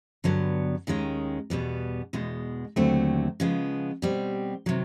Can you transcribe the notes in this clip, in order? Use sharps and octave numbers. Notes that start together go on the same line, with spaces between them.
G2 D3 F#3 B3
D#2 D#3 G#3 C#4
E2 B2 G3 B3
E2 B2 G#3
D#2 D3 F#3 A3 C4
C#3 F3 G#3 B3
B2 G3 C4
C3 D#3 F#3